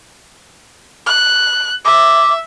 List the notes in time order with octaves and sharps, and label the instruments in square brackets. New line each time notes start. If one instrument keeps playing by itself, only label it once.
[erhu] F#6
[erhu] E5 [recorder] D6